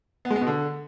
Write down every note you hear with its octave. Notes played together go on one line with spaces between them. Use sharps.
B3
G#3
B3
B2
D3